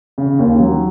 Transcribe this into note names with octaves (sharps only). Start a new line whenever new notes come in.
C#3
D#2
F#3